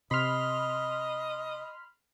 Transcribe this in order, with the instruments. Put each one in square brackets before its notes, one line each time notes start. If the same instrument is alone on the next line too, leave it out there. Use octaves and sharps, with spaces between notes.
[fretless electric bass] C3 [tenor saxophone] D#5 [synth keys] B5 C6 F6